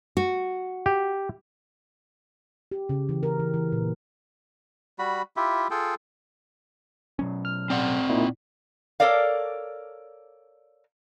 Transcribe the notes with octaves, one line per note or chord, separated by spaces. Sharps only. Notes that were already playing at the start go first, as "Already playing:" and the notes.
F#4
G4
G4
C#3
E3
A#4
E3
E3
A#2
G3 F#4 B5
E4 F4 G4 E5
F4 G#4 A4 G5
B2 F#3 C#4
F6
C4 D5 F#5
A#2 D#4 E4
A4 A#4 C#5 D5 F5